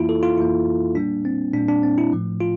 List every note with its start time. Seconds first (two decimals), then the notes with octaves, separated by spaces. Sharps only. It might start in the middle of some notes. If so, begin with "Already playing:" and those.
Already playing: F2 E3 A#3 E4 F4
0.09 A4
0.23 F4
0.38 F2 E3 A#3 E4
0.95 A#2 G3 A#3 D4
1.25 C4
1.54 A#2 G3 A#3 D4
1.69 D4
1.83 C4
1.98 E4
2.12 A2 F3 A3
2.41 F4